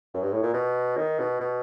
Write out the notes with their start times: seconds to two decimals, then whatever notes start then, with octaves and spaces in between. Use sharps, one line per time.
0.14 F#2
0.22 G2
0.33 A2
0.43 A#2
0.54 B2
0.97 D#3
1.19 B2
1.40 B2